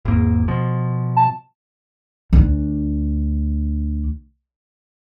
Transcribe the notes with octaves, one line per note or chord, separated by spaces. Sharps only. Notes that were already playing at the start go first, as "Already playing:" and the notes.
G#1 E2 A#3
B2 F3
A5
D2 D4